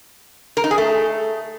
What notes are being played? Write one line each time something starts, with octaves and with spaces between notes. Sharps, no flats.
A#4
D#4
G#4
A3